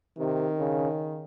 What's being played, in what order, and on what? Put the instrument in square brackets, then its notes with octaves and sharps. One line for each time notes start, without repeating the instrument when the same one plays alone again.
[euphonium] C3 [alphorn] D#3
[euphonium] C#3